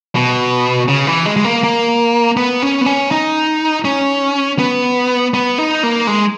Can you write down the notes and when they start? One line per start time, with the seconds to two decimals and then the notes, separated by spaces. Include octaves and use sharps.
0.15 B2
0.88 C#3
1.07 E3
1.25 G#3
1.36 G#3
1.44 A#3
1.64 A#3
2.37 B3
2.62 C#4
2.81 B3
2.86 C#4
3.11 D#4
3.85 C#4
4.59 B3
5.34 B3
5.58 D#4
5.83 A#3
6.07 G#3